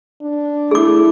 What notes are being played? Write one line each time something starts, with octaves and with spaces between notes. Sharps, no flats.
D4
A3 E4 G#4 D6